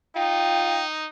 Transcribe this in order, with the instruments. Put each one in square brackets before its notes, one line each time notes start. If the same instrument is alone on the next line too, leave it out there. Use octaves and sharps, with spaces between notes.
[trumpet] D#4 [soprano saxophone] F4 [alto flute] G5